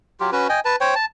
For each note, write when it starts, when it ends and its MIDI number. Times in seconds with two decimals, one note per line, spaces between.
0.20 0.30 54
0.20 0.30 65
0.20 0.30 67
0.32 0.48 61
0.32 0.48 66
0.32 0.48 71
0.49 0.60 75
0.49 0.60 79
0.49 0.60 80
0.65 0.76 71
0.65 0.76 81
0.81 0.94 72
0.81 0.94 73
0.81 0.94 79
0.95 1.05 81